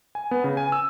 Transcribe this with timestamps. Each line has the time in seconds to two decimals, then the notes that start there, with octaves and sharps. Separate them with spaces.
0.15 G#5
0.31 B3
0.44 C#3
0.57 G#5
0.72 E6